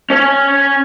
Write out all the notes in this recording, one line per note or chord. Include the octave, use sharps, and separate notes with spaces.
C#4 C#5